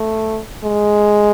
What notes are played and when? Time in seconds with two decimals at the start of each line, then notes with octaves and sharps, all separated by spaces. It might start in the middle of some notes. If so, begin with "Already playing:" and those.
Already playing: A3
0.64 G#3